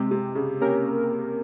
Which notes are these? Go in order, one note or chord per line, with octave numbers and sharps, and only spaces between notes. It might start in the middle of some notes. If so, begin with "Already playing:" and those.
Already playing: C3 G#3 C4 G4
C3
C#3
A#3 C#4 G4 A#4